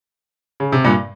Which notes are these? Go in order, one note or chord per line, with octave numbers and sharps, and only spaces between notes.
C#3
C3
G2 A#2